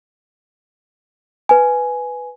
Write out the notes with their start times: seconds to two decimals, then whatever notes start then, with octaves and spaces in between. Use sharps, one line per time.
1.49 B4 G#5